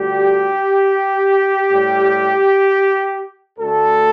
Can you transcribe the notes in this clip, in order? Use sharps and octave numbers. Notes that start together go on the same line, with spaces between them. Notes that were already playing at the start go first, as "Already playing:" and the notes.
Already playing: D2 D3 G3 G4
A2 G3
D2 D3 A3 A4